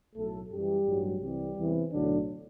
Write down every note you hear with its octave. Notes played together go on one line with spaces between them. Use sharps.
B1 A2 F#3 A3 A4
F#2 E3 G3 G4
A1 G2 F#3
C2 C3 E3 G3 G4
E2 C3 E3
B1 A2 D3 F#3 D4